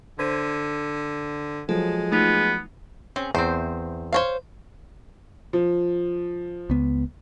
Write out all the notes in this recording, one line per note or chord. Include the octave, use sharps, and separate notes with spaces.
D3 C5 G#6 B6 D#7
F3 F#3 G#3 A4
A3 B3 D#4 F4
C4 C#4 G#4
E2 C4 C5
C5 C#5 F5
F3
C#2 B3